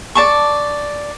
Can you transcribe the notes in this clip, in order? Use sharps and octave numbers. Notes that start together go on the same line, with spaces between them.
D5 A5 C#6